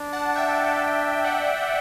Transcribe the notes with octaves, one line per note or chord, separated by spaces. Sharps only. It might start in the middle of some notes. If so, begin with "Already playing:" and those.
Already playing: D4
F#5 A5
E5 G5
D5 F#5